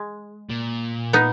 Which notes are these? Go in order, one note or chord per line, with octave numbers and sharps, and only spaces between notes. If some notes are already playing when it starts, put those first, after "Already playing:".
Already playing: G#3
A#2
B3 D#4